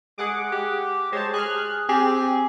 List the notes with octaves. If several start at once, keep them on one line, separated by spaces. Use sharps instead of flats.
G#3 G#4 F#5 D6
G4
G#3 C5 C#5 A5
G#4 F6 F#6
C4 G4 G#4